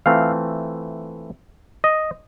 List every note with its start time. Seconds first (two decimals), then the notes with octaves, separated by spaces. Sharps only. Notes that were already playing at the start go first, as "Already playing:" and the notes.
0.06 E3 A3 C4 F4 F5
1.84 D#5